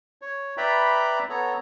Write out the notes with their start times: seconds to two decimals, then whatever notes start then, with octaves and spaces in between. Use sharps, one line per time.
0.22 C#5
0.57 B4 D5 E5 G5 A#5 B5
1.29 B3 A4 C#5 A#5